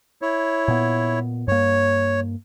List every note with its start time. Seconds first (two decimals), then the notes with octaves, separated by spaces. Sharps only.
0.22 E4 C#5
0.68 A#2 B3
1.48 G2 A#3 C#5